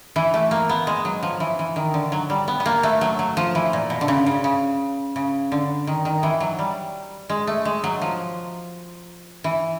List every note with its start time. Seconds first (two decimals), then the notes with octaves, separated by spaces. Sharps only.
0.16 E3
0.34 A3
0.51 A#3
0.69 B3
0.87 G#3
1.05 F#3
1.23 F3
1.40 E3
1.59 E3
1.76 D#3
1.94 D3
2.12 F#3
2.30 G3
2.48 B3
2.60 B3
2.66 A#3
2.83 A3
3.01 F#3
3.19 F#3
3.37 F3
3.55 E3
3.73 A#2
3.90 B2
4.01 D3
4.08 C#3
4.26 C#3
4.44 C#3
5.16 C#3
5.52 D3
5.87 D#3
6.05 D#3
6.23 E3
6.40 F#3
6.59 G3
7.30 G#3
7.47 A3
7.65 G#3
7.84 F#3
8.02 F3
9.44 E3